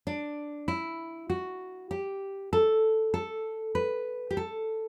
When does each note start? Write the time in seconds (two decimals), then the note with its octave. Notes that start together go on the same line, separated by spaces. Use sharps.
0.07 D4
0.68 E4
1.30 F#4
1.91 G4
2.53 A4
3.14 A4
3.75 B4
4.31 G4
4.37 A4